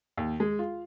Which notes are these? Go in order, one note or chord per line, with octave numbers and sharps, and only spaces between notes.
D#2
G#3
F4